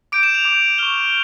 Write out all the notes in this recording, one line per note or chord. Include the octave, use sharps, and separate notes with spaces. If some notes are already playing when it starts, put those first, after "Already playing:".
D6 G6 D7
E7
F7
D6 G6
C#6 F6 G7